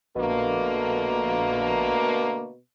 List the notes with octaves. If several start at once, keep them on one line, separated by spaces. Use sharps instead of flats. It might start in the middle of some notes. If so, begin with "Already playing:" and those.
A#1 B2 D3 A3 A#3